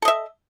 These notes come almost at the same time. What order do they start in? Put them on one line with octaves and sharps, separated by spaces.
A4 D#5 E5